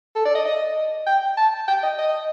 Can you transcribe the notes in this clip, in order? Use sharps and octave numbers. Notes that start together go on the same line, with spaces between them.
A4
D5
D#5
D#5
G5
A5
G5
D#5
D#5